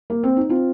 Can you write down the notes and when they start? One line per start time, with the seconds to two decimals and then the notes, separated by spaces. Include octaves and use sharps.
0.10 A#3
0.23 C4
0.37 D#4
0.49 C4 F4